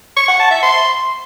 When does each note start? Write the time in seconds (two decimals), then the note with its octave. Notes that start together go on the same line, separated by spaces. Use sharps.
0.17 C#6
0.28 F#5
0.40 A5
0.51 E5
0.63 C6